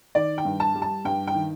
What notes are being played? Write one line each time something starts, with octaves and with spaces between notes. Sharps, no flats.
D#3 D5
G5
G2
A5
G3
A5
G2 G5
G5
D#3